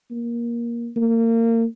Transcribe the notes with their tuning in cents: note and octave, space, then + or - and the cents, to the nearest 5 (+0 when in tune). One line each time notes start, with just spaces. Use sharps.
A#3 +15
A#3 -30